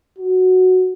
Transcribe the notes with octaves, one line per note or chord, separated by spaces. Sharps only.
F#4